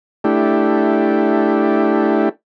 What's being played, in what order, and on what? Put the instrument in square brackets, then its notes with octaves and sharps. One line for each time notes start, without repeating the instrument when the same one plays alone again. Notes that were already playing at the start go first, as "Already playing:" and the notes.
[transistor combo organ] A3 D4 E4 G4